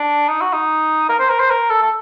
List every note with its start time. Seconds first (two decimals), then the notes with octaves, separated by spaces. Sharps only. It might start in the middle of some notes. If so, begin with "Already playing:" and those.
Already playing: D4
0.28 D#4
0.41 F#4
0.53 D#4
1.09 A#4
1.19 C5
1.30 A#4
1.40 C5
1.50 A#4
1.70 A4
1.82 A4